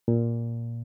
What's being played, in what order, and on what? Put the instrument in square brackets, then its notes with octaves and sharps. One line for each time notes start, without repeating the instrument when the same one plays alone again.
[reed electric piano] A#2